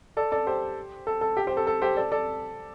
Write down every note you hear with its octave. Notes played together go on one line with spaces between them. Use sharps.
A4 D5
A4 D5
G4 C5
A4
A4
G4
G4 C5
A4
A4
G4 C5
A4 D5
A4 D5